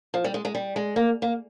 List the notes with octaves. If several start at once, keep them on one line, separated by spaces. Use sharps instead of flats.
F3
G3
G#3
G#3
G3
G#3
A#3
A#3